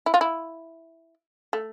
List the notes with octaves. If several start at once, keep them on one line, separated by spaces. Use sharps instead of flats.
E4
F4
E4
A3